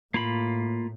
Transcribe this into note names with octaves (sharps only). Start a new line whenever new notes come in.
A2 A#3 F4 B5